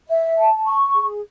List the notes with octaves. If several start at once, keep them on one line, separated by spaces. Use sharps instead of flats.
E5
A5
C#6
G#4